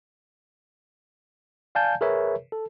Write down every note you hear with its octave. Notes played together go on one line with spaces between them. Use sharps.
D5 F5 G#5 A5 G6
G#4 A#4 B4 C#5 E5
A4